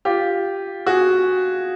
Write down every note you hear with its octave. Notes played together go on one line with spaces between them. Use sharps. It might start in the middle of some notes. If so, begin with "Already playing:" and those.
F4 G4
F#4 G#4